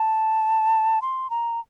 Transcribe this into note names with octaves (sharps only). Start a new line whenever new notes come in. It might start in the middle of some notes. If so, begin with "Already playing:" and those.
Already playing: A5
C6
A#5